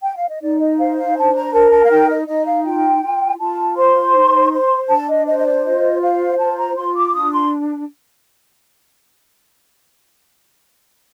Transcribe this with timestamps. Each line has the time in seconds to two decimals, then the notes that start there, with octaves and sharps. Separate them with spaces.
0.02 G5
0.16 F5
0.29 D#5
0.41 D#4 D5
0.60 D#5
0.79 C5 F5
0.97 F5
1.16 D4 A5
1.35 A#5
1.53 A#4 A5
1.71 A5
1.84 F5
1.90 D#4 G5
2.09 D#5
2.28 D#4 D#5
2.46 F5
2.65 F4 G5
3.03 F4
3.40 F4 A5
3.77 C5 C6
4.15 D#4
4.52 C5
4.89 D4 A5
5.09 D#5
5.27 C5 D#5
5.38 D#5
5.45 D5
5.64 F4 D#5
6.01 C5 F5
6.39 F4 A5
6.57 A#5
6.76 F4 C6
6.95 D6
7.13 D4 D#6
7.32 C6